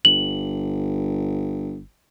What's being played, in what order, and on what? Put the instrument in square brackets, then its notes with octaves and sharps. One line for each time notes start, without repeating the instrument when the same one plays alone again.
[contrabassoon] G1 [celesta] F#7